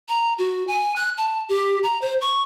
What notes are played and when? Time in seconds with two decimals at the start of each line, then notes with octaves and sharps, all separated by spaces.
0.09 A#5
0.38 F#4
0.67 G#5
0.96 F#6
1.18 A5
1.49 G4
1.83 A#5
2.02 C5
2.21 C#6